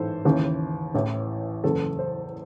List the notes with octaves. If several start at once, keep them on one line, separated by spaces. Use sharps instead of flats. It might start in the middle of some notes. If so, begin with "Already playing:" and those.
Already playing: A1 G#2 E3 A4 C5
D#2 C#3 E3
A1 A2 E3
F#1 E2 C#3 A4
C5